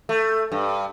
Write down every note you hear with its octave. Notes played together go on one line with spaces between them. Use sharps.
A3
G2